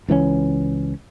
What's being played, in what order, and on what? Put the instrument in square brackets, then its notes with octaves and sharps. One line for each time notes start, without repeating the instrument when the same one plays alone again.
[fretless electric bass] C#2 E3 G3 C#4